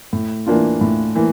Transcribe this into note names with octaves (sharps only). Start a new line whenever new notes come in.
A2
E3 A#3 D4 F4
A2
E3 A#3